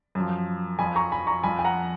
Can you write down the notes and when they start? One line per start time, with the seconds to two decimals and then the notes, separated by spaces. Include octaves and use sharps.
0.15 F#2
0.20 F3
0.79 F2 F3 G#5 B5
0.96 A#5 C#6
1.12 G#5 B5
1.27 A#5 C#6
1.43 F2 F3 G#5 B5
1.59 G#5
1.64 F#5 A#5